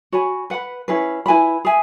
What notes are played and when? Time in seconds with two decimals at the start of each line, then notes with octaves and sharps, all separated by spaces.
0.12 F#4 C#5 G#5 B5
0.50 B4 F#5 B5
0.88 C#4 E4 G#4 B4
1.26 E4 B4 G#5 B5
1.65 G#4 E5 G#5